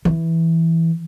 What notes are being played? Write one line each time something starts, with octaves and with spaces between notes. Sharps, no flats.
E3